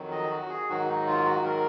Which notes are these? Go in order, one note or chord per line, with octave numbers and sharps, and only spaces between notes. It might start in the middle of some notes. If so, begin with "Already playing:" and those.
Already playing: F2 D#3 F#3
D#5
F#4
G#4
G#2 D#3 F#3 F#4
D#4
F4
F#4
A#4